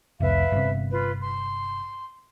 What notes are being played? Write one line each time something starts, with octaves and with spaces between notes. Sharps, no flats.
F1 C2 B4 E5 F5
G1 C3
F4 B4
C6